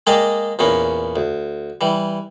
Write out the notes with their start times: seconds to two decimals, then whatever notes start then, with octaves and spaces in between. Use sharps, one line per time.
0.07 G#3 A#3 G#4 D5 D#5 G5
0.59 E2 A#2 B3 C#4
1.16 D2
1.81 E3 G3